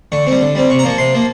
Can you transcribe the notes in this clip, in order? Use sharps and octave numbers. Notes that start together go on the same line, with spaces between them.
D3 C#6
G3 C4
D3
G3 C4
C3 C#6
A#5
F3 A#3 C#6
C3 C6
F3 A#3